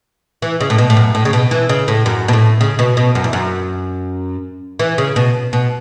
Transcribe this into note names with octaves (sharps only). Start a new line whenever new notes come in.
E3
C#3
A2
B2
A2
F#2
A2
C#3
B2
E3
C#3
A2
F#2
B2
A2
C#3
B2
B2
F#2
E2
F#2
E3
C#3
B2
B2